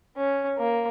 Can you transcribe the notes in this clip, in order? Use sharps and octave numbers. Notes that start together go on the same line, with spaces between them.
C#4
A#3